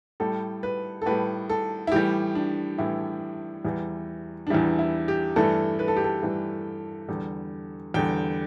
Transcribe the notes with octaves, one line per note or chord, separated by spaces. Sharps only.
A2 G3 A4
B4
A4
A2 G3 B4
A4
E4
A2 E3 G3 G4
D4
A2 E3 G3 E4
E2 E3 G3
D4
E2 E3 G3 E4
E4
G4
G2 E3 A3 A4
B4
A4
G4
A4
G2 E3 A3
E2 D3 G3
E2 D3 G3 G5